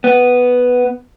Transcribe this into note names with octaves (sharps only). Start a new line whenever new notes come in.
B3